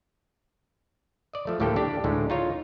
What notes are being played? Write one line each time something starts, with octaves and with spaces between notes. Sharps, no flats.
D5 D#5
F3 A3
D2 A2 A#3 G4 A4 G5
D4 G4
D2 A2 D3 G#3
D#4 F4 C#5